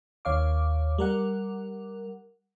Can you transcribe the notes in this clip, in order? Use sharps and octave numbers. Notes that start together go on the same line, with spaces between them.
D#2 C#5 F5 D6
G3 A#4 F#5